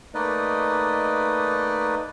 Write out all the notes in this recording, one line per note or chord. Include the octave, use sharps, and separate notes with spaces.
A3 A#3 D#4 B4 D5 D#5